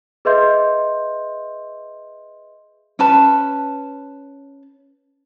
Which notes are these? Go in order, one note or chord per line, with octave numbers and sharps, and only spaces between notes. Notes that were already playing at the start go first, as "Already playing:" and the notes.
G#4 B4 D#5 E5 C6 G6
C#4 B4 A5